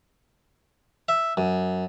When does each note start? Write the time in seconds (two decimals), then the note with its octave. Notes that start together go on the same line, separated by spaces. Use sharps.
1.09 E5
1.37 F#2